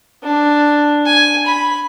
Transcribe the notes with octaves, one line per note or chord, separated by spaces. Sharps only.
D4
G#5
B5